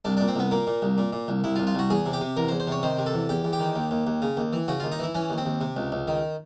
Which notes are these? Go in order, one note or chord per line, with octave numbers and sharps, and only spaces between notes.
C2 D4
A#2 D4
C4
C2 B3
A#2 A#3
A#2
C2
A#2
A#2
C2
C2 E4
F4
C2
F4
C2 F#4
E2 G#4
C3
G4
C3
E2 A#4
C5
E2
C5
C3 C#5
D#3 C5
C3
A4
E2
E2 G4
E2
G4
D#3
D#2
D#2
D#2
C#3
D#2
E3
C#3 F#4
D#2 F4
D#4
E3 E4
E3 C#4
D#2
C4
D#2
C3
C#2
C#2
D#3